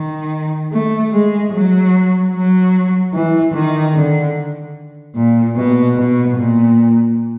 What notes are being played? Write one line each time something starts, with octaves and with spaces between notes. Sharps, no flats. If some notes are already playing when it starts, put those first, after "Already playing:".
Already playing: D#3
A3
G#3
F#3
F#3
E3
D#3
D3
A#2
B2
B2
A#2